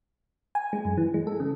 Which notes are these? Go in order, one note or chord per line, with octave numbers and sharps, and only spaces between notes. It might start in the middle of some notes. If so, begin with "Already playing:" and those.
G#5
G#3
F#2
E3
G#3
A4
C#3